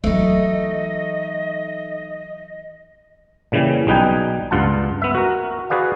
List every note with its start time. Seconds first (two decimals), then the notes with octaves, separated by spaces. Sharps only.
0.04 E3 F#3 A3 D#4 D#5
3.52 A#2 C#3 E3 G3
3.87 B1 G3 D#4 B4 G5 G#5
4.51 C#2 G2 F4 F#5 A5
5.02 B3 E5
5.15 F#4 A#4
5.70 F#4 G#4 B4 D5 F5